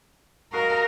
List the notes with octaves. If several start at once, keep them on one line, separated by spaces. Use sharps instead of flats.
F#4 A#4 D#5 F5